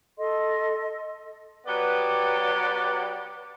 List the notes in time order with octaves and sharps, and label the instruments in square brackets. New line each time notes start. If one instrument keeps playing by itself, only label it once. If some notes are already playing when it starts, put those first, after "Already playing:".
[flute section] A4 D#5 C6
[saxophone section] F#3 B3 G4 B4 D5